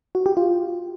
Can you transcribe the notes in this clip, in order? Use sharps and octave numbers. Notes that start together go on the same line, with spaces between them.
F#4
G4
F4